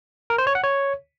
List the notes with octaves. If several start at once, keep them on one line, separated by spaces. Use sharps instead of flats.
A#4
C5
C#5
F#5
C#5